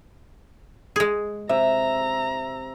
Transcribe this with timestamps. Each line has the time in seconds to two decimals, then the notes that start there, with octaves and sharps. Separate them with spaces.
0.96 G#3 G#4
1.49 C3 E5 A#5